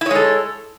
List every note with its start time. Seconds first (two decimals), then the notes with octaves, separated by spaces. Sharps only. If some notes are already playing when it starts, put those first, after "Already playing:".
0.01 E4
0.06 C#5
0.11 G#3
0.15 A4